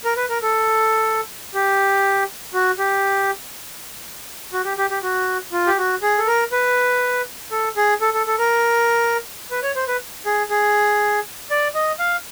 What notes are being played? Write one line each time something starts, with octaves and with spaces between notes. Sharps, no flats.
A#4
B4
A#4
A4
G4
F#4
G4
F#4
G4
G4
G4
F#4
F4
G4
F#4
G#4
A4
A#4
B4
A4
G#4
A4
A4
A4
A#4
B4
C#5
C5
B4
G#4
G#4
D5
D#5
F5